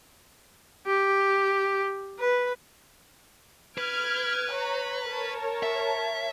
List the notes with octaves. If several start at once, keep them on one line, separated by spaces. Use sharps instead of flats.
G4
B4
B4 F6 G#6 D7
C#5 A#5
A#4 C#5 A5
E5